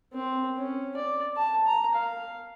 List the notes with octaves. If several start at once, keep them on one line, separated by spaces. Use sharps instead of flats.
C4
C#4
D5
A5
A#5
F5